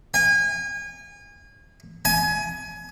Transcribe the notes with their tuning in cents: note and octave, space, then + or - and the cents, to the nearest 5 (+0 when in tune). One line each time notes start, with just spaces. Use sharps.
G#5 -30
G#5 +25